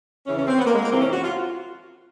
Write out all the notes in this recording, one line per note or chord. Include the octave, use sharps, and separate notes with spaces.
E2 C#3 E3 C#4
C#4
C4
B3
A#3
G#3
A#3
F2 C3 E3 C4
C#4
F#4
F4